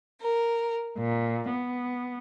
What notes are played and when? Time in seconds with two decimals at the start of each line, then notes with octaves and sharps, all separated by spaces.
0.21 A#4
0.97 A#2
1.48 B3